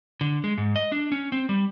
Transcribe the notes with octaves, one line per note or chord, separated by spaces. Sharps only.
D3
G#3
G#2
D#5
D4
C#4
C4
G3